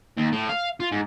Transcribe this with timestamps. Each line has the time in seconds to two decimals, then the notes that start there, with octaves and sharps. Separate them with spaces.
0.17 D#2
0.32 A2
0.49 F5
0.80 F4
0.92 G#2